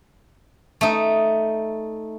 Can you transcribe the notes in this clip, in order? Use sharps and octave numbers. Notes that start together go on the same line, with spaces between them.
A3 D#4